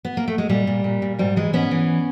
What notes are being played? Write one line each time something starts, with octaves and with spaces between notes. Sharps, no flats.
B3
A#3
A3
G#3
A#2 G3
A#2
A#2
A#2
G#2 G3
E3 G#3
G#2 B3 C#4
E3